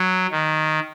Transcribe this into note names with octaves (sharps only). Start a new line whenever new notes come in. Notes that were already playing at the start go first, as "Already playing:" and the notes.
Already playing: F#3
D#3